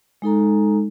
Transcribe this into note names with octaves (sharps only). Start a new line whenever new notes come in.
G#3 D#4 A4 A#5